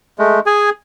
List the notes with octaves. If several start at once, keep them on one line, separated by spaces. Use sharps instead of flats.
G#3 A3
G#4 G#5